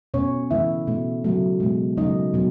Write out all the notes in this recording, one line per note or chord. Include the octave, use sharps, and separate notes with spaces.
B2 A3 C#4 C#5
C#3 E3 A3 E4 E5
B2 A3
C#3 F#3 A3
B2 G#3
C#3 F#3 A3 D#4 D#5
B2 F#3